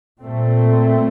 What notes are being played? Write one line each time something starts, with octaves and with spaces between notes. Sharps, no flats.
A#2 A3 C4